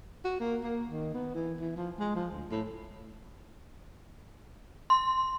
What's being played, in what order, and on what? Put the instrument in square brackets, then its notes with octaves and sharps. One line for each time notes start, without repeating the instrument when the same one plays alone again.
[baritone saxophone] F#4
A#3
A#3
D#3
B3
E3
E3
F3
G#3
F3
D2
A2
[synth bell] C6